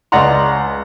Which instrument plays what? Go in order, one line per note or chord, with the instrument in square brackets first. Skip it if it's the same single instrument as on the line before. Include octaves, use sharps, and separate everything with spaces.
[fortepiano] C#2 D5 D#5 F#5 A#5 C6